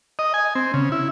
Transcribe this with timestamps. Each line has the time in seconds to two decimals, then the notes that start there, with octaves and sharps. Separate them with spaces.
0.19 D#5
0.34 G#5
0.55 C4
0.74 C#3
0.92 E4